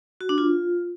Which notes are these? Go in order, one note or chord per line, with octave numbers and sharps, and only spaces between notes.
F#4
D4
F4